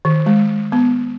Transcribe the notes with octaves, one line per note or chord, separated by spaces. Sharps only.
D#3
G#3
B3